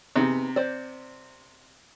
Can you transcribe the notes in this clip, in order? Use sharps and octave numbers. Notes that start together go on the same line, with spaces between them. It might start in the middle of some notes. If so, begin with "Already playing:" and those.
C3 B3 D#4 G#4
C5 D5